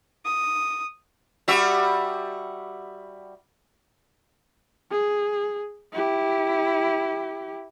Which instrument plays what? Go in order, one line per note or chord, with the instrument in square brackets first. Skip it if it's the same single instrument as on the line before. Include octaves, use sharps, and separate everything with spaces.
[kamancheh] D#6
[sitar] G3 F#4 E5
[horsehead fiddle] G#4
E4 G4